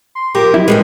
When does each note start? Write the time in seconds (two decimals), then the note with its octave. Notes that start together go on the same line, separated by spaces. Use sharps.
0.15 C6
0.35 F3 G4 A#4 D6
0.54 F#3 E4
0.68 G#2 G3 G#3 B4